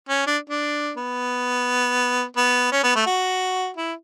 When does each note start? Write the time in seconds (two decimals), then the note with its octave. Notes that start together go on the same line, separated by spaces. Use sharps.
0.09 C#4
0.27 D4
0.50 D4
0.97 B3
2.37 B3
2.72 C#4
2.83 B3
2.95 A3
3.06 F#4
3.77 E4